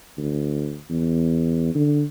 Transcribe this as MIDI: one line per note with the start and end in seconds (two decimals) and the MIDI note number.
0.18 0.77 38
0.89 1.72 40
1.75 2.03 50